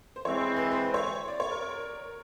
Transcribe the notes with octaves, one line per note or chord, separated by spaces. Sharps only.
C5
E3 G#3 C4 C#5
C5
B4
C5
C#5
D5
C#5
A#4
A#4